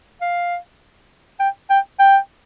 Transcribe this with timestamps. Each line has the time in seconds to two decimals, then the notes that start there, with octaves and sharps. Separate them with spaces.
0.21 F5
1.40 G5
1.70 G5
1.99 G5